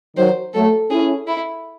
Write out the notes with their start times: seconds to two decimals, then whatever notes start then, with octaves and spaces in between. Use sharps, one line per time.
0.17 D#3 F#3 C5
0.54 F#3 A3 A4
0.90 C#4 E4 G#4
1.27 E4